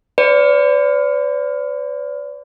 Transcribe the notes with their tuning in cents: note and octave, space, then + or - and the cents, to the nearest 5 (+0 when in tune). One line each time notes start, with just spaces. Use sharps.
B4 +40 D5 -40